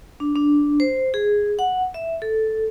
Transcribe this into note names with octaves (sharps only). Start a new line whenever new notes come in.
D4
D4
C5
G#4
F#5
E5
A4